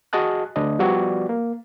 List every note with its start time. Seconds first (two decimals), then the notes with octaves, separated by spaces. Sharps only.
0.13 F#4 G#4 D#5 A5 F#6
0.56 D2 D4 D#5
0.79 F3 G3 B3 F#4 D5
1.29 A#3